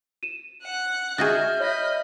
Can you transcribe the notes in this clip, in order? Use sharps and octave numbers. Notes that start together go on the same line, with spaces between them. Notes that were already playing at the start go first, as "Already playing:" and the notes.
D#7 E7
F#5 F#6
D#4 F#4 G#4 E5 F6 G6 A6 A#6
C#5 D#5 E5 B5 A#6